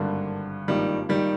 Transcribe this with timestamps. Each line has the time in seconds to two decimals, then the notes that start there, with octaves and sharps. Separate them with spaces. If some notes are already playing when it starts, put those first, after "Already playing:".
Already playing: G#1 G2 D3 G3 A#3 D4
0.68 G#1 G2 D#3 F3 G3 A#3
1.09 D#3 G3